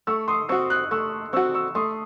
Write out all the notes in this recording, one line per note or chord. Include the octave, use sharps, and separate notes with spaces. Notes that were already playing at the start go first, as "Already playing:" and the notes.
A3 C#6 E6
C6 D#6
C4 F#4 C#6 E6
D#6 F#6
A3 C#6 E6
C4 F#4 C#6 E6
C#6 E6
A3 C6 D#6